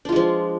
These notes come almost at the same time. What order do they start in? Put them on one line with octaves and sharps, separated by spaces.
D4 F4 G#3 F3